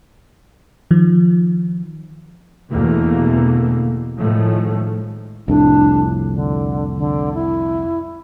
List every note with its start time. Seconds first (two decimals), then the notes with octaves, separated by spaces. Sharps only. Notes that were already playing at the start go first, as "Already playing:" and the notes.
0.91 D#3 F3
2.71 E2 B2 D3 E3 A3 A#3
4.19 A2 D#3 F3 G#3 A3
5.48 C2 F2 A2 D4
6.33 D3
6.97 D3
7.34 E4